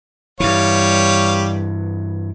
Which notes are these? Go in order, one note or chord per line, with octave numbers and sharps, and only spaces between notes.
G2 E3 G3 C#5 F5